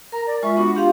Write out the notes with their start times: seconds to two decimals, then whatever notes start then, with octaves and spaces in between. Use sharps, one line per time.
0.12 A#4 A#5
0.26 D5
0.43 G#3 F4 E5 C#6
0.56 B3 D4 F#4
0.75 D4 F4 G4 F5